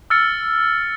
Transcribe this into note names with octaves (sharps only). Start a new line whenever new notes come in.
E6 F6 A6 C#7